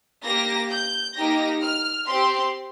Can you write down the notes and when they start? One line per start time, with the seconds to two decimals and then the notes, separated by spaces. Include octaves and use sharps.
0.24 A#3 G4 A#6
0.70 G6
1.15 A#3 D#4 G4 A#6
1.62 F6
2.07 C4 G4 C6